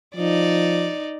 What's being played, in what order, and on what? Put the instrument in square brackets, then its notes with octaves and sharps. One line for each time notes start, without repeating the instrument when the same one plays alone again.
[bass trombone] F3 [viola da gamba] D#4 D5